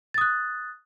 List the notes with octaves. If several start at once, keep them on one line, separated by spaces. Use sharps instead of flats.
D#6 F#6 A6